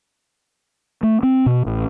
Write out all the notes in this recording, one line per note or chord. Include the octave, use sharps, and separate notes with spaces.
A3
C4
B2
A1